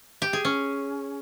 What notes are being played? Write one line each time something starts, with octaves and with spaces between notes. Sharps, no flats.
G4
G#4
C#4